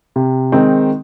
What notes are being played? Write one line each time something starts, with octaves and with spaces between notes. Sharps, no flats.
C3
D#3 G#3 C4 D#4